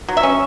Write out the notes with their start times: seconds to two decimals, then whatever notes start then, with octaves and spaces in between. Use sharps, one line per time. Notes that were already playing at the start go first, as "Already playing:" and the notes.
0.08 F#3
0.17 E5
0.23 C#4